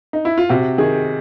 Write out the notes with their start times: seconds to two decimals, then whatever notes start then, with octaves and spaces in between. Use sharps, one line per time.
0.13 D#4
0.25 E4
0.38 F4
0.49 C3 F#4
0.78 D#3 G#4